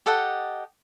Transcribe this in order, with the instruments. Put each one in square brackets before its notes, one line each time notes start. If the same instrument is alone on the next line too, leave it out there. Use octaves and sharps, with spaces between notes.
[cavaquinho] G4 A4 D#5 F#5